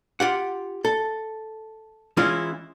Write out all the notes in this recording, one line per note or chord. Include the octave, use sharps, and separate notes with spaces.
F4 G4 F#5
A4
E3 G#3 C#4 E4 F4